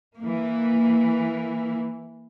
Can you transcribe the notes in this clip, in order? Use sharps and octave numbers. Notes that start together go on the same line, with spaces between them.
E3 A#3